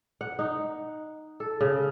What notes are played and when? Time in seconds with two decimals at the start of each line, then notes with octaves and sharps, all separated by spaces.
0.21 F#5
0.39 D#4
1.40 A4
1.61 C#3